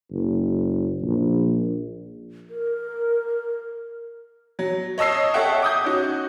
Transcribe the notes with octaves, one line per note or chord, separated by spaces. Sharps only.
F#1
A#1
A#4
F#3
C#5 D#5 A5 E6 C7
A4 C#5 E5 F#5 G5 C#6
D6 D#6 G6
C#4 D#4 F#4